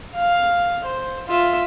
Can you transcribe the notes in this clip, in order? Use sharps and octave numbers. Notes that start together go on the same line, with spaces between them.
F5
C5
F4 E5